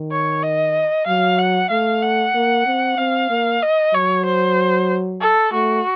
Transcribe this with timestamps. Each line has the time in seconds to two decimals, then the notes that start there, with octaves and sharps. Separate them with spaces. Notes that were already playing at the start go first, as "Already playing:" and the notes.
Already playing: D#3
0.11 C#5
0.43 D#5
1.07 F#3 F5
1.39 F#5
1.70 A3 F5
2.02 F#5
2.35 A#3
2.66 C4
2.98 C4 F5
3.30 A#3
3.62 D#5
3.94 F#3 C#5
4.26 C5
5.21 A4
5.52 A3 F#4